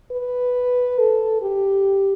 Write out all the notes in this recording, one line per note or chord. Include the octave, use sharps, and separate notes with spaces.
B4
A4
G4